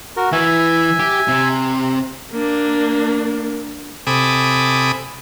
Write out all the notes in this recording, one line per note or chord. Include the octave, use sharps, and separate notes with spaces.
F#4 A#4
E3 E5 G#5
G4
C3
A#3 D4
C3 A4 G#5 B5 D6 D#6